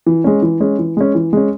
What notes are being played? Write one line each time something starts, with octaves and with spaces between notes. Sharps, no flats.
E3
G#3 C#4
E3
G#3 C#4
E3
G#3 C#4
E3
G#3 C#4